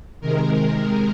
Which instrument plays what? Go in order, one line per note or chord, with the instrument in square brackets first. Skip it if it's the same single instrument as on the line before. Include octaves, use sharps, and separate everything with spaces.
[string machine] C3 D#3 G#3 A#4